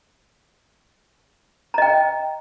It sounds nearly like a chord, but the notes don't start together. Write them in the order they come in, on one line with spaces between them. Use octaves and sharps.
A#5 D#5 G5